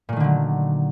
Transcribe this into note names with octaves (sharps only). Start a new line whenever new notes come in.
A#2 D3 D#3 F#3 A3